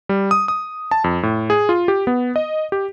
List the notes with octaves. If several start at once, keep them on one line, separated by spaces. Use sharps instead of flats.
G3
D#6
D#6
A5
F2
A2
G#4
F4
G4
B3
D#5
G4